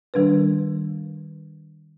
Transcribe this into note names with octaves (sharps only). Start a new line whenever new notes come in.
D#3 G3 D4 A#4 B4